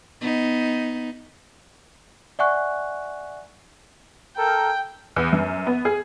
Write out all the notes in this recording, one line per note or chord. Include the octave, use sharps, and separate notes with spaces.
B3 D#4
D5 E5 F#5 G#5 C#6 F#6
A4 A#4 G5
E2
F#2
B3
G#4